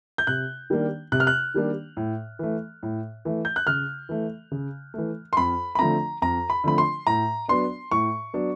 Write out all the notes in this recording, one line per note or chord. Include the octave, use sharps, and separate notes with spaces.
G6
C3 F#6
D#3 G3 A#3 D4
C3 F#6
F6
F#6
D#3 G3 A#3 D4
A2
E3 A3
A2
E3 A3
G6
F#6
C#3 F6
E3 A3
C#3
E3 A3
C6
F2 B5
B5
D3 F3 A3 C4 A#5
F2 A#5
B5
D3 F3 A3 C4 B5
C6
A2 A#5
F#3 B3 D4 C6
A2 C#6
F#3 B3 D4